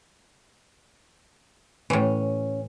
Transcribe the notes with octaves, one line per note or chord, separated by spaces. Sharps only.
A2 E3 C#4